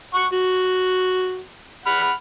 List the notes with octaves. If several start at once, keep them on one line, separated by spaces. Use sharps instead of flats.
F#5 C#6
F#4
F#5 B5 F6